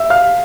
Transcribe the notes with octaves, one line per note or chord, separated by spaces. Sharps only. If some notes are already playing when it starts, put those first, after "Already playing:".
Already playing: E5 E6
F5 F6